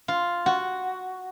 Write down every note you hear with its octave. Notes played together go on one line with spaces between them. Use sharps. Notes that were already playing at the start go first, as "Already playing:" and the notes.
F4
F#4